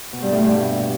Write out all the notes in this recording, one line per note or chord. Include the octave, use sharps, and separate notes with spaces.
B2
G2
A2
G2
B2